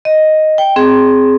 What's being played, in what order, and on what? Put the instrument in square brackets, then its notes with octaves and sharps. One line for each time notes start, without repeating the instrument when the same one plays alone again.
[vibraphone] D#5
G5
C4 G#4